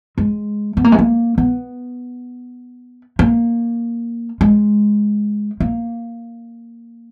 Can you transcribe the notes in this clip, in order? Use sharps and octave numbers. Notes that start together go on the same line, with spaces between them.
G#3
B3
A#3
G#3
A#3
B3
A#3
G#3
A#3